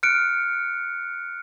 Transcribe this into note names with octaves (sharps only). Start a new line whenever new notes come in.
F6 F#6 C#7 D7